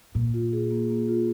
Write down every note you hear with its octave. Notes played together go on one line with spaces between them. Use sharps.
A#2 A#3
F4
G#4
A#3
A#3
F4